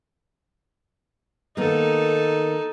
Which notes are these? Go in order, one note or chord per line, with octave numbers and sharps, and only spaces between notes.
D#3 A#3 B3 D#4 A4